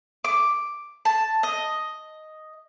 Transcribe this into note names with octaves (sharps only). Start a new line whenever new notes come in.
D6
A5
D#5